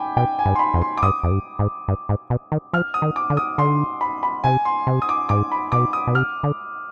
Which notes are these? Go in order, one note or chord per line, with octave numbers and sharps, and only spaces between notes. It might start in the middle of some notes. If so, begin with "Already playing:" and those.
Already playing: G5 G#5 B5 D6
B2 G5
G#5
G2
C6
B5
F2
C6
D6
G2 D#6
F2
G2
G#2
G2
G#2
B2
D#3
F3 F6
D#6
D#3
D6
D3
D#6
D3 C6
B5
B5
C3 G#5
C6
C3
D#6
D6
G#2 D6
B5
B2 D6
D#6
B2
C3 F6
D3